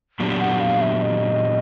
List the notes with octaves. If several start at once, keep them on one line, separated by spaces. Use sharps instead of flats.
A#2 F#3 B3 D4 G4
F#5
F5
E5
D#5